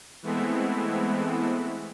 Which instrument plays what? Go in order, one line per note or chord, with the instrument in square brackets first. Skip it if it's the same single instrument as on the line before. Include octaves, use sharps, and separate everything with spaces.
[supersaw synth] E3 G#3 A3 B3 C4 E4